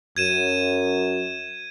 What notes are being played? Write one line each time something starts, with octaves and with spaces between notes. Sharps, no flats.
F#2 G#6 D#7 E7